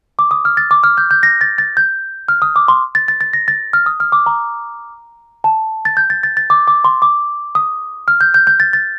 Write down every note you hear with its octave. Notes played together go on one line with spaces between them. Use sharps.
D6
D#6
F6
A6
D6
F6
G6
G6
A#6
A6
A6
G6
F6
D#6
D6
C6
A6
A6
A6
A#6
A6
F6
D#6
F6
D6
A#5
A5
A6
G6
A6
A6
A6
D6
D6
C6
D6
D#6
F6
G6
G6
G6
A6
A6